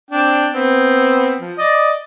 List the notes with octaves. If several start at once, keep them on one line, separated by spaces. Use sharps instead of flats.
C4 D4 G5
B3 C4
F3
D5 D#5